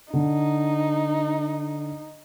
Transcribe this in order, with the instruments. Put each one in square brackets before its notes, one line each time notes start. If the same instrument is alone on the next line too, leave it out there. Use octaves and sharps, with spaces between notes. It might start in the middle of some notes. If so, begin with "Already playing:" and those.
[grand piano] D3 [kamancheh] D#4